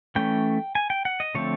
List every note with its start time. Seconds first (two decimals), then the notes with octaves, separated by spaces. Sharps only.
0.15 E3 A3 C#4 G5
0.75 G#5
0.90 G5
1.05 F#5
1.20 D#5
1.35 D3 F3 A3 C4 C#5